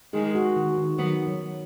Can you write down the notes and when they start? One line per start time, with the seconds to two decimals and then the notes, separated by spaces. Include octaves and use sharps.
0.13 D#3 G#3 G#4
0.35 F#4
0.56 D#3
0.78 D#3
0.98 D#3 F#3 B3
1.27 F#3